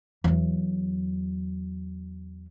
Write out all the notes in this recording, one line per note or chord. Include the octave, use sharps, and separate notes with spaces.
E2 F#3